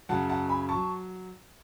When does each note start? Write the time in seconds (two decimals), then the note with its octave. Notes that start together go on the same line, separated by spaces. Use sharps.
0.09 F#2 C#3 F#3 F#5 A5
0.29 F#5 A5
0.49 G#5 B5
0.69 F#3 A5 C#6